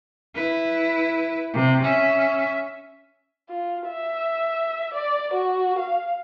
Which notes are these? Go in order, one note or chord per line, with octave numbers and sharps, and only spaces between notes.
E4 B4
C3
C#4 E5
F4
E5
D5
F#4
F5